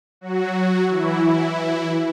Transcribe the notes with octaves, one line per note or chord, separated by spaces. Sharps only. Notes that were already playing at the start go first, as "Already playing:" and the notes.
F#3 F#4
E3 E4
E3 E4